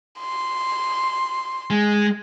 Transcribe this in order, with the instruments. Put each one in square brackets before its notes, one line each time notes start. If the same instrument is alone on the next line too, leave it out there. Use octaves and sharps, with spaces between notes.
[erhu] C6
[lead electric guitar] G#3